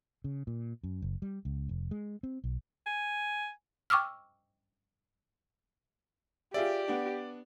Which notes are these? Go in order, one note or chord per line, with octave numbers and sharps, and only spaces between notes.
C#3
A#2
F#2
F#1
G3
C#2
F1
G#3
C4
B1
G#5
G5 C#6 D6 E6 F6
F4 G4 G#4 D5 E5
B3 D4